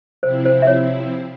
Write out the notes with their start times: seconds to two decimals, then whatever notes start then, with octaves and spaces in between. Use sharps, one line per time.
0.23 C3 F3 C4 E4 C5
0.45 C5
0.62 E5
0.67 C#5